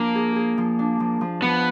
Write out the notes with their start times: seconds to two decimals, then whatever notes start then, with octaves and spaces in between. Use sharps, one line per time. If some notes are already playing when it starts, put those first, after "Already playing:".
Already playing: F3 A#3 D4
0.15 G#4
0.36 G#4
0.58 F3
0.79 D4
1.00 F3
1.21 F3
1.42 F3 B3